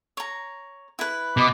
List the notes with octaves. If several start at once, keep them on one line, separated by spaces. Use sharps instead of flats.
C#5 A#5
E4 B4
B2 D#5 B5 D6